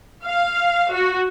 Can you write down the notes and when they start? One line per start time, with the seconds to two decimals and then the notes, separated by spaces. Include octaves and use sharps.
0.24 F5
0.92 F#4